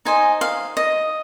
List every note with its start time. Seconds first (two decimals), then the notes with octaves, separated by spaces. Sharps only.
0.05 D#4 C5 D#5 G#5
0.41 F5
0.77 D#5